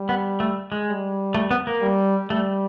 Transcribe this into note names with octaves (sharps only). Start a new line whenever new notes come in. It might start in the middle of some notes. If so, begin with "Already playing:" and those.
Already playing: G3
B3
A3
G#3
G3
A3
B3
A#3
G3
G3 A3